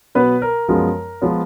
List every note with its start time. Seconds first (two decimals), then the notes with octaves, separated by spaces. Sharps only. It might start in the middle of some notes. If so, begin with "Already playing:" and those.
0.15 B2 F#3 B3 B4
0.42 A#4
0.68 F#2 F3 G#3 B3 A#4
1.22 F3 G#3 B3